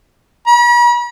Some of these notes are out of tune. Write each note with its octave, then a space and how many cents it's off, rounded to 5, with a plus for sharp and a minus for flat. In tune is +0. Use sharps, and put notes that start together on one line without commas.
B5 -45